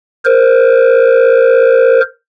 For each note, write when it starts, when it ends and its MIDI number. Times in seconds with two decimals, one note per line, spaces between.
0.25 2.00 70
0.25 2.00 72